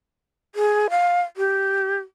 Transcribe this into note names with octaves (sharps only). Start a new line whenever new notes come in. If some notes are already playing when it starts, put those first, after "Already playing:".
G#4
F5
G4